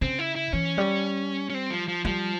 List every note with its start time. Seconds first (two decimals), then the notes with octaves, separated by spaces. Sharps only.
0.01 C#3 C4
0.19 E4
0.36 E4
0.53 E3 C#4
0.78 G3
1.50 C#4
1.54 C4
1.70 F3
1.88 F3
2.05 F3 G3